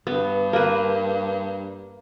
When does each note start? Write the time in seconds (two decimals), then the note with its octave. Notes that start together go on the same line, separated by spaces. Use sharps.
0.07 G2 B3
0.53 A#3 B4